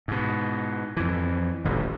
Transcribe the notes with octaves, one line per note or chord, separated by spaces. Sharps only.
G#2 B2
F2 E3
D#1 A1 D2